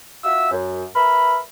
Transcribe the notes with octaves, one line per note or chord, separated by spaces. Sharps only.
F4 F#4 E5 E6
F#2
A#4 B4 E5 B5